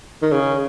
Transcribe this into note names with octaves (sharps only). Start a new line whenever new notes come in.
D#3
C#3